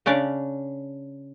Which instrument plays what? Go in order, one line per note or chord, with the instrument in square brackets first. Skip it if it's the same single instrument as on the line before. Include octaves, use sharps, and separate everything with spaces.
[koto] C#3 C#4 D4 D5